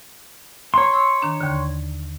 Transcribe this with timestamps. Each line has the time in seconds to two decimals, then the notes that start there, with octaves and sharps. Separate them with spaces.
0.74 C#5 A#5 C6
0.94 E6
1.21 D#3 D4 A#5
1.41 D#2 D3